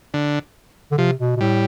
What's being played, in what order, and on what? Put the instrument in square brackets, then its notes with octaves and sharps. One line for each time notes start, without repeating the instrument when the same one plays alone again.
[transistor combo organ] D3
[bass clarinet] D3
[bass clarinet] C3 [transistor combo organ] F3
[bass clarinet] B2
B2
[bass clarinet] A2 [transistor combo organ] G3